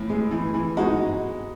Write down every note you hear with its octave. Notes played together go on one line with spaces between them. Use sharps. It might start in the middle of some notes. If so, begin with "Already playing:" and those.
Already playing: A2 E3
G#3
E3
E3
G#3 D#4 F#4